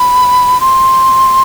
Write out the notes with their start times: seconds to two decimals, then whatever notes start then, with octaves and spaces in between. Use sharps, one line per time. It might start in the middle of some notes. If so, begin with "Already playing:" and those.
Already playing: B5
0.61 C6